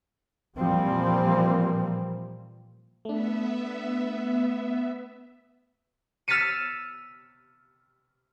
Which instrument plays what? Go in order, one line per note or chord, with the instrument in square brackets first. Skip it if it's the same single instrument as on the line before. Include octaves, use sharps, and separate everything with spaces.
[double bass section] A#2 E3 F3 G3 A#3 C4
[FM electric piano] A3 D4 [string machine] B3 E5
[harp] E6 F6 A6 B6 C#7 D#7